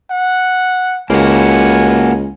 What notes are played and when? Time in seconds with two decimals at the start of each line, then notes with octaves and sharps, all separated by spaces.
0.10 F#5
1.10 C#2 A#3 F#4 G#5